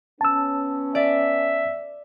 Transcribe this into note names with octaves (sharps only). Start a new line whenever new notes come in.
B3 C#4 A5 E6
D5 E5